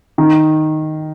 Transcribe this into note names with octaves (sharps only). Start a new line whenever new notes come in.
D#3